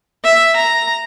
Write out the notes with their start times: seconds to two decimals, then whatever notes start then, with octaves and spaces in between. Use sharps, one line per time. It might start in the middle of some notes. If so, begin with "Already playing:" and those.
0.24 E5
0.56 A#5